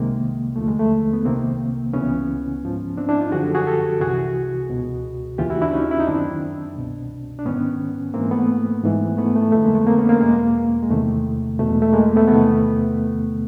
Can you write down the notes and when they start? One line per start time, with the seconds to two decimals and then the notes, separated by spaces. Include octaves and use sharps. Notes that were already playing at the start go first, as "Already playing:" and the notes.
Already playing: C2 C3 D#3 G#3 A#3
0.56 D#2 D3 F3 A3
0.68 G#3
0.79 A3
1.13 B3
1.25 C2 C3 D#3 A#3 C4
1.94 C#2 C#3 E3 B3 C#4
2.63 G#2 F3
2.97 C4 D4
3.09 D4 E4
3.20 D#4 F4
3.32 F#2 D3 F3 F#4 G#4
3.43 G4 A4
3.55 F#4 G#4
3.66 G4 A4
4.00 C2 C3 E3 F#4 G#4
4.69 C#2 B2
5.38 D#2 C#3 E3 F4 G4
5.50 E4 F#4
5.61 D4 E4
5.73 C#4 D#4
5.91 E4
6.00 D#4
6.07 F#2 D#3 C4 D4
6.76 C2 B2
7.39 D4
7.45 G#2 D#3 B3 C#4
8.14 G#2 E3 A#3 C4
8.31 A3 B3
8.84 G#2 E3
9.17 A3 B3
9.36 A3
9.52 F2 D3 F3 A3
9.64 G#3 A#3
9.75 A3 B3
9.86 A#3 C4
9.98 B3 C#4
10.09 A#3 C4
10.21 E2 B2 G#3 A#3
10.83 G#3
10.90 E2 C3 D#3 A3
11.59 E2 B2 A3
11.70 G#3
11.82 A3
11.93 G#3 A#3
12.16 A3 B3
12.27 E2 C3 D#3 A3 B3